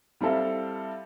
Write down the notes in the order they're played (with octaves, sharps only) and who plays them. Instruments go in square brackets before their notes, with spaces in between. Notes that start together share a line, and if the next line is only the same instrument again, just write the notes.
[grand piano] G3 C4 E4 A4 F5